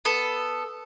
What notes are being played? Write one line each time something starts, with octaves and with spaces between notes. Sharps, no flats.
B3 A4